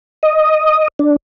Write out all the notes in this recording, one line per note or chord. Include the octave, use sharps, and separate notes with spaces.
D#5
D4